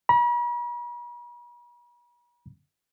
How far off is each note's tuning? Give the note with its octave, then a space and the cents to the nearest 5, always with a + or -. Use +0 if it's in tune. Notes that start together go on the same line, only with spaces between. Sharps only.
B5 -45